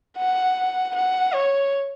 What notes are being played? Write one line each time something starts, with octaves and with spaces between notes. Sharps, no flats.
F#5
F#5
C#5